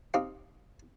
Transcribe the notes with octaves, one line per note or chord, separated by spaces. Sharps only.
C4 D#4 G4 F5 C6